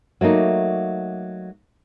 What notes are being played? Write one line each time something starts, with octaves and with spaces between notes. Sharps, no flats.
F#3 A3 A#3 D#4